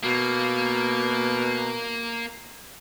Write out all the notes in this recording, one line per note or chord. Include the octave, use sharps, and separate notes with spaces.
B2 A#3